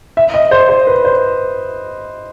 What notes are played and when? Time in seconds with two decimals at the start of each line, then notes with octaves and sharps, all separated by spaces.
0.17 E5
0.34 D#5
0.51 C5
0.69 C5
0.87 B4
1.05 C5